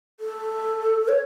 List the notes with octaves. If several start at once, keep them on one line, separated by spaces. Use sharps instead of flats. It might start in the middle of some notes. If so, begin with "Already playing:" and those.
A4
C#5